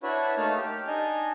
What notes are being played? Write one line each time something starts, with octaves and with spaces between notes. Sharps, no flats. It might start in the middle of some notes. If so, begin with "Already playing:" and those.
D4 E4 F#4 B4 C#5 E5
A3 A#3 D#4 C#5 A5 F6
G4 F6
D4 D#4 D#5 G#5